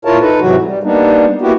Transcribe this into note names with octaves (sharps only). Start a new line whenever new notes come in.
A#2 E4 F4 A#4 C#5 A5
D#4 A4 B4
G#2 C3 E3 F#3 F#4
G3
G3 A#3 B3 D4 D#4
A#3 B3 E4 F#4 G4